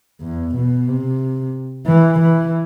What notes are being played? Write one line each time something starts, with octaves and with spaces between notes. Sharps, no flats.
E2
B2
C3
E3
E3